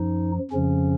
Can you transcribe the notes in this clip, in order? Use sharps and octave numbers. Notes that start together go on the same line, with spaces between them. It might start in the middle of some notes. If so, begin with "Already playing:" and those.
Already playing: F#2 F3 D#4
F2 C#3 F3 C#4